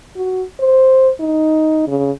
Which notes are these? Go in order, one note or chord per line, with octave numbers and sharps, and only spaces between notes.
F#4
C5
D#4
C#3